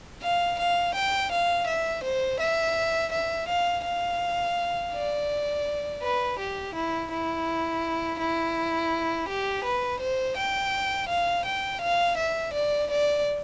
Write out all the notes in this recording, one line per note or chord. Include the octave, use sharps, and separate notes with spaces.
F5
F5
G5
F5
E5
C5
E5
E5
F5
F5
D5
B4
G4
E4
E4
E4
G4
B4
C5
G5
F5
G5
F5
E5
D5
D5